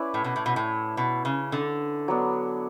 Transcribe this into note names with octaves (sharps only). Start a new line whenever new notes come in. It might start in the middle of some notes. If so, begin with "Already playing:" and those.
Already playing: C#4 E4 B4 D5
A2
B2
A2
B2
A2
B2
C#3
D3
F#3 B3 D4